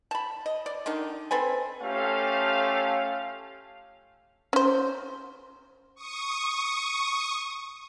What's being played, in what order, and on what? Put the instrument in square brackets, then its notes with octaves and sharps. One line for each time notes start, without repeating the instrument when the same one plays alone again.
[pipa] A5 B5
D#5
D5
D3 D#3 D4 D#4
C4 A4 B4 G#5
[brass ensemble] A3 C#4 F4 G4 A4 F5
[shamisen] C#4 C5
[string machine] C#6 D#6